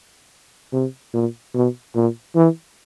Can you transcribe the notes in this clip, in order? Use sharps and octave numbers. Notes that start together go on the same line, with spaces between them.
C3
A#2
B2
A#2
E3